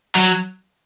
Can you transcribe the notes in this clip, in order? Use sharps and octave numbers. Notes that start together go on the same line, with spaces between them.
F#3